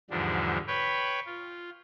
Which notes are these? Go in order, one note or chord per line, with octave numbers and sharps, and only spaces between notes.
E2 G#2 D3 F3 G3 D4
B4 C#5 G5 B5
F4